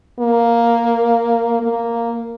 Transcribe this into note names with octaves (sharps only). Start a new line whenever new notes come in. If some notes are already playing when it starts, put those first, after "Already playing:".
A#3
A#3